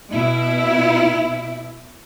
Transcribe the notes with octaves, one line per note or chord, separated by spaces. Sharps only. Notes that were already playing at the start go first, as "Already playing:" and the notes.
B2 E4